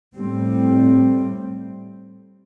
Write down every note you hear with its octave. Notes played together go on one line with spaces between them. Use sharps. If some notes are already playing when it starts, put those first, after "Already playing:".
A2 G3 C4